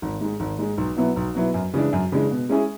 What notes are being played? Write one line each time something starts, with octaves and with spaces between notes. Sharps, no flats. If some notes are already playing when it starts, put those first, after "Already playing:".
G#1
G#2 G#3
G#1
G#2 G#3
B1
B2 F#3 B3 E4
B1
B2 F#3 B3 E4
F#2
C#3 E3 G#3 D4
F#2
C#3 E3 G#3 D4
B2
G#3 C#4 E4 G#4